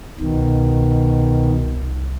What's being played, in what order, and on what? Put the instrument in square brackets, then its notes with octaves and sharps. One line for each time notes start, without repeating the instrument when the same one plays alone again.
[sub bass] C2 [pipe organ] B2 D#3